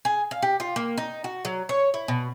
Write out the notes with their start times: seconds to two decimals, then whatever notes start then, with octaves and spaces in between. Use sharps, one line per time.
0.05 G#4
0.31 F5
0.42 G4
0.60 F4
0.76 A#3
0.98 D#4
1.24 F#4
1.45 F#3
1.69 C#5
1.94 E4
2.08 B2